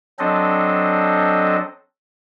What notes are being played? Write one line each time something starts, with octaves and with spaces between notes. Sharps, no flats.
F#3 C4 D4 A4 C5 D#5